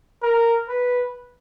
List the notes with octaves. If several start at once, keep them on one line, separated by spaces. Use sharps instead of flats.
A#4
B4